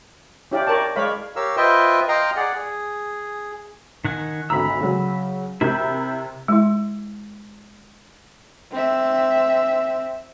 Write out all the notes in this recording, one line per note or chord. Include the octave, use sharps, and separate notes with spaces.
C#4 E4 G4 D5 F5
A#4 C#5 D5 A5
G#3 C#5 D5 F5 B5
G4 A#4 C#5 F5 E6
F4 B4 C5 D#5 E5 G5
D#5 F5 G5 A#5 C6
G#4 D5 F#5
G#4
D#3 F#5 G#5
G#1 D2 A#5 B5 E6
C#3 F#3
C3 E4 A#4 G6 G#6
G#3 E4
C4 E5